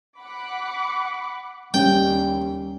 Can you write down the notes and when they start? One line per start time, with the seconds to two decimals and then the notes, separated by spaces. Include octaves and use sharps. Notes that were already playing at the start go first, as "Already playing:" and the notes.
0.20 F#5 B5 D6
1.74 D#2 G3 C#4 G5